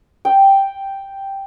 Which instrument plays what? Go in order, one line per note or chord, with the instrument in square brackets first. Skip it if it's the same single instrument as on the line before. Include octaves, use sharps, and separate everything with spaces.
[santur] G5